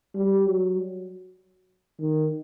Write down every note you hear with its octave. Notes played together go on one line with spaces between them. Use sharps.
G3
F#3
D#3